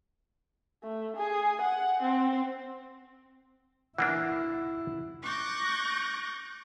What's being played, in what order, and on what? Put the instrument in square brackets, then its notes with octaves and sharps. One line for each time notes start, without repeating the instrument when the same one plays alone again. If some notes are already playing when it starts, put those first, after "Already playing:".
[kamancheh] A3
G#4
F#5
C4
[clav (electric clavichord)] E3 A#3 D4 [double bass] E4 [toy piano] F#5
[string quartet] C#6 D6 F#6 G6 A6 A#6